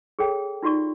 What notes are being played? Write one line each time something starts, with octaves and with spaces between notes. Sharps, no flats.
G#4 A4 C#5 G5
D#4 F4 F#4 D5 C#6